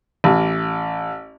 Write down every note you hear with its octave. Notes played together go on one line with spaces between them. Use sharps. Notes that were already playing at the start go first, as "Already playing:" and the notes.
A1